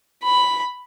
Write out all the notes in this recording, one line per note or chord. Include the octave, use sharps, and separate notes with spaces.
B5